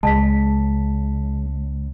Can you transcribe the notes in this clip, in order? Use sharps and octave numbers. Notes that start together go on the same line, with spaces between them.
C#2 G#3 A5 B6